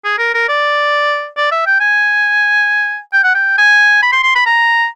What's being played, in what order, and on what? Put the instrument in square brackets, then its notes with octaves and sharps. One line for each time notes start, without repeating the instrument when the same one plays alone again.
[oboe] G#4
A#4
A#4
D5
D5
E5
G5
G#5
G5
F#5
G5
G#5
B5
C6
C6
B5
A#5